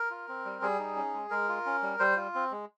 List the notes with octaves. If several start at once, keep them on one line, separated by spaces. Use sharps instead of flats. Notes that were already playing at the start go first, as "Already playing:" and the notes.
Already playing: A#4
F4
C4
G3
G3 G#4
D#4
C#4
G#3
G#3 A#4
F4
C#4
G3
G3 C5
F4
C4
G#3